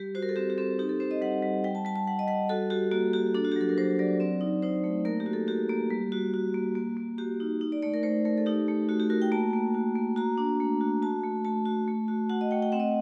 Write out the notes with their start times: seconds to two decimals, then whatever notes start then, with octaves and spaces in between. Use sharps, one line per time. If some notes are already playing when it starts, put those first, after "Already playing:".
Already playing: G3 G4
0.15 F#4 C5
0.22 A#4
0.29 A4
0.36 C4 G4
0.50 G4
0.58 C4 A4
0.79 D#4 G4
0.89 A4
1.00 C4 C5
1.11 D#5
1.21 G3 F#5
1.43 G3
1.64 G3 G5
1.75 A5
1.85 G3 A5
1.96 A5
2.07 G3 F#5
2.19 D#5
2.28 G3 F#5
2.49 F#4 A4
2.70 F#4 G4
2.91 A#3 F#4
3.13 F#4 G4
3.35 D4 A4
3.45 F#4
3.52 G4
3.56 F#3 A4
3.69 A#4
3.78 F#3 C5
3.99 F#3 D5
4.20 C4 D5
4.41 D#4
4.62 D#4 C5
4.84 A3
5.05 A#3 A#4
5.20 G4
5.26 F#4
5.33 A4
5.48 F#4 G4
5.69 A#3
5.90 G3
6.12 F#4
6.34 F#4
6.54 A#3
6.75 A#3
6.97 A#3
7.18 F#4 G4
7.40 D#4
7.61 D#4
7.72 D5
7.82 A3 D5
7.94 A#4
8.03 A3 C5
8.25 A3 A#4
8.37 A4
8.46 D#4 G4
8.68 A3
8.89 A3 F#4
9.00 G4
9.10 F#4 A#4
9.22 G5
9.32 A#3 A5
9.53 A#3
9.74 F#4
9.96 A#3
10.16 F#4 A#5
10.38 D4
10.60 A3
10.81 F#4
11.02 F#4 A5
11.24 A3
11.45 A3 A5
11.65 F#4
11.88 A3
12.08 F#4
12.30 F#4 F#5
12.41 D#5
12.51 A3 G5
12.62 G5
12.72 C4 F#5
12.80 D#5